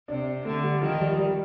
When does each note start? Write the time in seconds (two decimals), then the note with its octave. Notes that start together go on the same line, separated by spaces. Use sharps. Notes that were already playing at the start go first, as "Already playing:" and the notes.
0.08 C3 D4
0.45 D3 A3
0.63 G3
0.82 D#3 F3
1.00 G3
1.18 G3